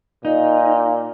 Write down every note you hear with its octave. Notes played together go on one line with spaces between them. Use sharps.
A#2 D#4